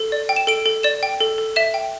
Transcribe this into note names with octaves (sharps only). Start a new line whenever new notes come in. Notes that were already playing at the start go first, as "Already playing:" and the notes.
Already playing: A4
D5
G5
E7
A4 D7
A4
D5 E7
G5
A4
A4
E5 E7
G5